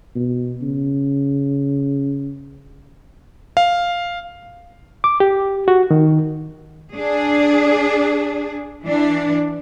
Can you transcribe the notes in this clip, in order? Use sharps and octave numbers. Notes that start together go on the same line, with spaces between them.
B2
C#3
F5
D6
G4
F#4
D#3
D4 G#4
E3 D4